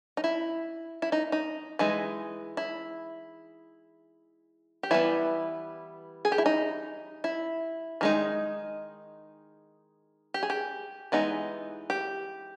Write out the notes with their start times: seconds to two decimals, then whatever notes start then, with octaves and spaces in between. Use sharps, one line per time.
0.17 D#4
0.24 E4
1.02 E4
1.12 D#4
1.32 D#4
1.79 E3 G#3 D#4
2.57 E4
4.83 G4
4.91 E3 G3 B3 E4
6.25 G#4
6.32 G4
6.38 E4
6.46 D#4
7.24 E4
8.01 D#3 G#3 D#4
10.34 G4
10.43 G#4
10.50 G4
11.12 E3 G#3 B3 D#4
11.90 G4